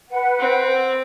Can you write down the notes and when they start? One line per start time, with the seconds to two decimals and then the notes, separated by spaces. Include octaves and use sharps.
0.10 B4 F#5
0.40 C4